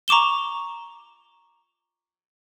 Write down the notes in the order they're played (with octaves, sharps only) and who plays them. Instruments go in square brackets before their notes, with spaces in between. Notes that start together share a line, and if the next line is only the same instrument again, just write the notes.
[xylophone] A#5 C#6 D6 E7 G7